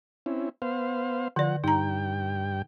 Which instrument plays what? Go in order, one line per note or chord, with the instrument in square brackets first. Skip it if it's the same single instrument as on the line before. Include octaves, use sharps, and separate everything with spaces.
[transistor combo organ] C4 C#4 E4
B3 C5 F5
[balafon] D3 D5 [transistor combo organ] F3 F#5
[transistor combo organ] G2 G5 [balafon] D#4 A#5